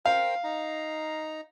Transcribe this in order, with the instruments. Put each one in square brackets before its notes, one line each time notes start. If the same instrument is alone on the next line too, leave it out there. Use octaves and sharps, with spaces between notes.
[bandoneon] A#4 C5 G5 [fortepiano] F5
[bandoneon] D#4 A#5